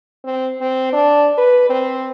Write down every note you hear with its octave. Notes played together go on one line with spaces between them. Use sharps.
C4
C4
D4
B4
C4